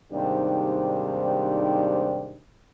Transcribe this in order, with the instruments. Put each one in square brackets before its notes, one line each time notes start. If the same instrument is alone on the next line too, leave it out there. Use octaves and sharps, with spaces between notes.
[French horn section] D#2 G#2 C3 G3 D4